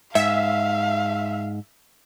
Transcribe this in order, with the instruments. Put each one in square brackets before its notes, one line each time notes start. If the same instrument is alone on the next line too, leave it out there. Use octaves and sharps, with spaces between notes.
[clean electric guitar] G#2 [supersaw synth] E5 [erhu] F5